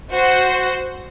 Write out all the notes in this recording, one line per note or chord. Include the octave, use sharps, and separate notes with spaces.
F#4 C5 F#5